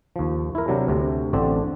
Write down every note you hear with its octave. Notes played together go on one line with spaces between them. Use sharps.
D#2 F3
E4 A#4
C3 F#3 D4 A#5
D2 C3
A1 D3 C4 D4 D5